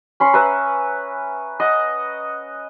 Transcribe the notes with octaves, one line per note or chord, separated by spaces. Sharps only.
C#4 B5 C6
B4 E5 A#5
D#5 F#5